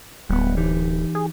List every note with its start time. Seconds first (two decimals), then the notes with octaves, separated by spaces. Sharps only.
0.29 D1 G3 B3
0.57 E3 D#4 G4
1.15 G#4